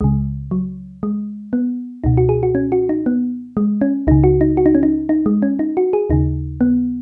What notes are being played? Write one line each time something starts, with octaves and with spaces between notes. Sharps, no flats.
C#2 C#3 G#3
F#3
G#3
B3
C#2 B2 D#4
F#4
G#4
F#4
C#4
F#4
D#4
B3
G#3
C#4
C#2 C#3 D#4
F#4
D#4
F#4
D#4
C#4
D#4
D#4
G#3
C#4
D#4
F#4
G#4
D#2 C#3 D#4
B3